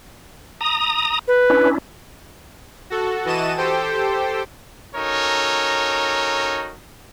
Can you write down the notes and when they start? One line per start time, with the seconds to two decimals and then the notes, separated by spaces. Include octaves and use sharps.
0.61 A#5 D#6
1.28 B4
1.50 C#4 D4 E4
2.90 F#4 A4
3.25 E3 F#4 D#5 A5 D#7 E7
3.58 G4 A4 C5 G5
4.95 C#4 D#4 F#4 A4 A#4 C#5